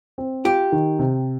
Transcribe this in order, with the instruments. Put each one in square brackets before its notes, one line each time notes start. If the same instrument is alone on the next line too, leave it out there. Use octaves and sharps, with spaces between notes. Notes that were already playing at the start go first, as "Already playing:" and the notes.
[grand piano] C4
[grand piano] F4 [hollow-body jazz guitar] G4
[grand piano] D#3
C3